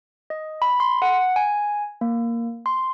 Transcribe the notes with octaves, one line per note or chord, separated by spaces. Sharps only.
D#5
B5
C6
F#5
G#5
A#3
C6